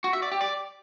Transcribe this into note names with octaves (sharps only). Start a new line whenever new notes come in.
F#4
E5
D5
G4
D5